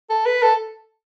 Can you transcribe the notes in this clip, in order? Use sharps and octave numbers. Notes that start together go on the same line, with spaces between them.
A4
B4
A4